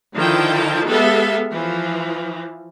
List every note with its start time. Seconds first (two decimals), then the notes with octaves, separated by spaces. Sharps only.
0.17 D3 D#3 F3 E4 G5 A5
0.86 G#3 B3 G4 A4 E5 F5
1.51 E3 F3